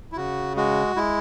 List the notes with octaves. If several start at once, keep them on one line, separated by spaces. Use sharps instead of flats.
E4
C#3 F#4
G#3 F#4
G#3 E4